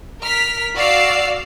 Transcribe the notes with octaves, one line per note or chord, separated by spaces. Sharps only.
A#4 F6 B6
F#4 D5 F5 E6 F6 C7